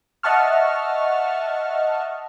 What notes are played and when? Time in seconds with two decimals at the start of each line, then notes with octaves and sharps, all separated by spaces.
0.23 D#5 E5 F#5 A5 C#6 F6